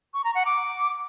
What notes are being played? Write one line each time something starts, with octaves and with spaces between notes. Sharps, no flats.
C#6
A#5
F#5
D6